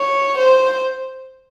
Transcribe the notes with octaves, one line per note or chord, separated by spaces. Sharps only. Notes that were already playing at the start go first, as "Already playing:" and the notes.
Already playing: C#5
C5